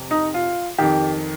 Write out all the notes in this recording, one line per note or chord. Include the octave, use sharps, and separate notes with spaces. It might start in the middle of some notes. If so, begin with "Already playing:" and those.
Already playing: F2 C3
D#4
F4
F2 D#3 G4